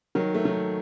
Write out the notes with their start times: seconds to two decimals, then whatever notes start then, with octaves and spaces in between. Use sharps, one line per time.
0.15 D#3 F#3
0.35 A3
0.45 D#3 F#3